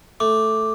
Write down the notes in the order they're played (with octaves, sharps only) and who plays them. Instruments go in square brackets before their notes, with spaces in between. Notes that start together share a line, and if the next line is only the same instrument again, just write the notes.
[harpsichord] A3 [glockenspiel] D6